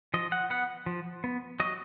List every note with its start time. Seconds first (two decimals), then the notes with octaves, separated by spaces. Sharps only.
0.14 F3 D#5
0.32 F#5
0.50 B3 F#5
0.86 F3
1.24 B3
1.60 F#3 D#5